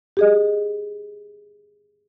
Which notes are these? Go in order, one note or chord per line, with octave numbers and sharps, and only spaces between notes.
G4 G#4 D#5